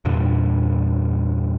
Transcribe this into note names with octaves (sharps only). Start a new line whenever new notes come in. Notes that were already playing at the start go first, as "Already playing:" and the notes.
E2 G2 A#2 D3